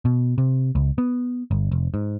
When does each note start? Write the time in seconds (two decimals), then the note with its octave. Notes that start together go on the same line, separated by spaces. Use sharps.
0.05 B2
0.38 C3
0.75 C#2
0.98 B3
1.51 G1
1.72 F1
1.94 G#2